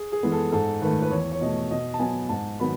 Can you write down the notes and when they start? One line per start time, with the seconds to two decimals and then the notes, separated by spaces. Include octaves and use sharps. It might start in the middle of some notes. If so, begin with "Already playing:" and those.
Already playing: G#4
0.12 G#4
0.23 E3 G#3 B3
0.32 A4
0.52 G#2 A4
0.81 D#3 A3 B4
1.02 B4
1.11 E2 C#5
1.32 C#5
1.41 B2 A3 D#5
1.71 B2 D#5
1.94 A5
1.99 F#3 B3 G#5
2.29 G#2 A5
2.59 D#3 F#3 B3 B5